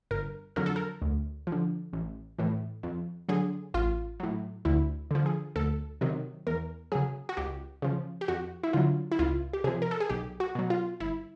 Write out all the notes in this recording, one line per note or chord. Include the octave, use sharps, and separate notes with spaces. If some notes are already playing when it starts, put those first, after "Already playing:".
G1 A#4
F2 D3 F#3 A#4
A4
A#4
D2
F3
D3
A1
A2 E3
F2
D3 F#3 G#4
A1 F4
A2 F#3
D2 E4
D3 F3
G#4
D2 A4
C3 D#3 F#3
E2 A#4
C#3 F#3 G#4
F#4
C#2 G4
C#3 F3
G4
F2 F#4
E4
D3 F#3 F4
E4
C#2 F4
G4
C3 F3 G#4
A#4
A4
G#4
B1 G4
F#4
B2 F#3
F4
G1 E4